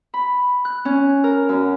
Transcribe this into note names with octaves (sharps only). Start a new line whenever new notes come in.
B5
F#6
C#4
A#4
F#2